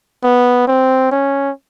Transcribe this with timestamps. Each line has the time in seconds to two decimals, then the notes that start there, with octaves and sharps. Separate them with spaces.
0.24 B3
0.68 C4
1.11 C#4